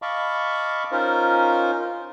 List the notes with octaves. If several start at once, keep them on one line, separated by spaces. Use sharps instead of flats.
D#5 F5 A5 B5 C#6 D6
C#4 D#4 F4 A#4 C5